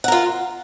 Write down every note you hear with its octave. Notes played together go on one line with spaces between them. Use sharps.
F4 A#4 F#5